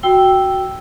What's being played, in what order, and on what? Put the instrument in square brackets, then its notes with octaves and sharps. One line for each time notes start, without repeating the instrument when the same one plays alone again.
[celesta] F#4 G5 E6 G7